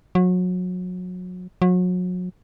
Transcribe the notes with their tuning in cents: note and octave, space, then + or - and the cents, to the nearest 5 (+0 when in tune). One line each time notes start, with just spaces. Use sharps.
F#3 -30
F#3 -35